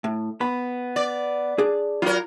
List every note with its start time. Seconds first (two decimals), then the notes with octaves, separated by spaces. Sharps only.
0.04 A2
0.41 B3 B5
0.96 D5
1.58 D4 G#4
2.02 F#3 F4 A#4